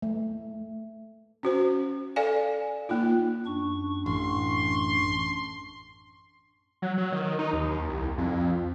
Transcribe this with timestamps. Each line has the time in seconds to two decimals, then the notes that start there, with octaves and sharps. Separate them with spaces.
0.02 A3
1.43 C#4 F#4 C5
2.16 A4 D5 F5 G#5
2.89 A#3 D#4 F4
3.46 F#2 D4 C#6
4.06 A1 C6
6.82 F#3
6.98 F#3
7.12 D#3
7.39 D#4
7.53 D#2
7.89 C2
8.18 F2